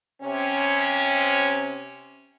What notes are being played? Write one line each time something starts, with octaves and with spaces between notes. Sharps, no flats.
C3 C#4